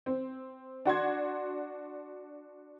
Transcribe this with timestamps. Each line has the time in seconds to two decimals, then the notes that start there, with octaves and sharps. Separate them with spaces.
0.06 C4
0.85 D4 F#4 C6 G#6